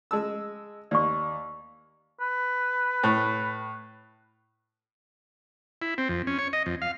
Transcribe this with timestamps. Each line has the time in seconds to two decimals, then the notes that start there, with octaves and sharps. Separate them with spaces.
0.11 G#3 A5 E6
0.91 D#2 D5 C#6
2.20 B4
3.03 A2
5.82 E4
5.98 C4
6.09 F2
6.27 C#4
6.39 C#5
6.53 D#5
6.66 F2
6.82 F5